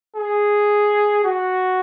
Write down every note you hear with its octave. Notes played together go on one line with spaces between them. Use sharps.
G#4
F#4